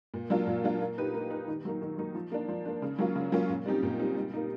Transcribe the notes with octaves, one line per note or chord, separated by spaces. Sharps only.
A#2
F#3 A#3 D4 F4
A#2
F#3 A#3 D4 F4
A#3
D#4 G4 B4
A#3
D#4 G4 B4
D#3
F#3 A#3 D#4
D#3
F#3 A#3 D#4
F3
A#3 D4
F3
A#3 D4
C#3
F#3 A#3 C#4 F4
C#3
F#3 A#3 C#4 F4
A#2
G3 C4 D#4 G4
A#2
G3 C4 D#4 G4
G3
A#3 D#4